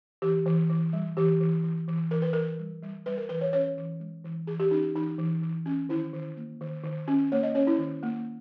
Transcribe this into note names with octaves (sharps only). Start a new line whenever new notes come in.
E3 G4
E3
E3
G3
E3 G4
E3
E3
E3
E3 A#4
B4
E3 A#4
G3
G3
G3 B4
A#4
E3 B4
C#5
C#4 C#5
E3
G#3
E3
E3 G#4
G4
C#4 D#4
E3 D#4
E3
E3
C#4
D#3 E4
D#3
A#3
D#3
D#3
C#4
A#3 C#5
D#5
C#4 C#5
E4
D#3
A#3